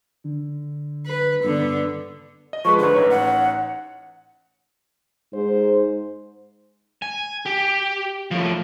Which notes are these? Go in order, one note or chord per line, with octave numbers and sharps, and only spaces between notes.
D3
B4
G2 D3 B3
D#5
F3 G#3 B4 C#6
G#2 D3 B4
A1 D#4 C#5
F#5
G#2 C5
G#5
G4
A2 F3